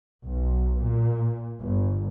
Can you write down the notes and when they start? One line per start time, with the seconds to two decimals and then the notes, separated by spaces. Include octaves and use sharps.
0.24 B1
0.80 A#2
1.61 G1